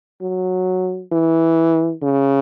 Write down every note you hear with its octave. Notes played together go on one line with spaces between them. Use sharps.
F#3
E3
C#3